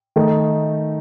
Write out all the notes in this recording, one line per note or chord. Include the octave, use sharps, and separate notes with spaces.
D#3 A3 D#4